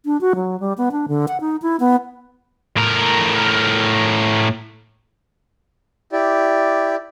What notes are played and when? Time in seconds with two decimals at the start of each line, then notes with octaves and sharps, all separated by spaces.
0.05 D4
0.21 F#4
0.35 F#3
0.60 G3
0.78 B3
0.92 D4
1.08 D3
1.28 F#5
1.41 D#4
1.62 E4
1.80 B3
2.77 A2 A#4
6.12 E4 G4 D5